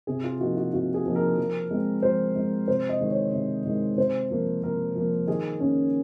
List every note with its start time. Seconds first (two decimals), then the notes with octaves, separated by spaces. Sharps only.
0.07 C3 G#4
0.24 F4
0.40 F3 A#3 D#4 F#4
0.57 F#4
0.73 C3 F#4
0.94 G#4
1.05 F3 A#3 D#4
1.16 A#4
1.37 F3
1.71 G#3 C4
2.02 F3 C5
2.35 G#3 C4
2.68 C3 C5
2.89 D#5
3.01 D#3 G#3
3.11 C#5
3.33 C3
3.65 D#3 G#3
3.98 C3 C5
4.30 F3 A#3
4.63 C3 A#4
4.95 F3 A#3
5.27 D#3 G#4
5.60 A#3 C#4